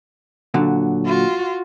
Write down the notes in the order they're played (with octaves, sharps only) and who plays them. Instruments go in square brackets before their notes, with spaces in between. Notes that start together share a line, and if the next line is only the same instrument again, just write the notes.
[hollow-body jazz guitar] A#2 D3 F#3
[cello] F4 F#4